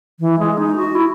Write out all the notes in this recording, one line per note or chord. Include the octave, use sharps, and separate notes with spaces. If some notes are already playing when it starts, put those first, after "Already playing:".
E3
G#3
D#4
F#4
E4